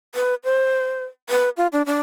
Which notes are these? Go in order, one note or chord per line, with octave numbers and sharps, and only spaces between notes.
B4
C5
B4
F4
D4
D4